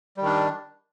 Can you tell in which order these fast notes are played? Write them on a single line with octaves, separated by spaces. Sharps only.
G3 D#3 D4